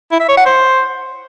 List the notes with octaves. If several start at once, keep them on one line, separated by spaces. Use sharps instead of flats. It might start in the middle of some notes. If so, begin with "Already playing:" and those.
E4
E5
C#5
F#5
C5